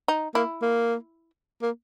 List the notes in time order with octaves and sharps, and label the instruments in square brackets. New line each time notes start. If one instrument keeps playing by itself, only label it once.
[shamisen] D#4
[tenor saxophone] A#3 [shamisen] E4
[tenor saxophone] A#3
A#3